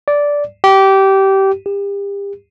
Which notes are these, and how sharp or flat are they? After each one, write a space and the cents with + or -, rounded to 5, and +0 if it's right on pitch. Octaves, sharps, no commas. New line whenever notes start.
D5 -10
G4 -20
G4 +35